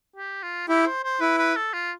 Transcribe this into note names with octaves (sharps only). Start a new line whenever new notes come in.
G4
F4
E4 G4
C5
C5
E4 B4
B4
A4
F4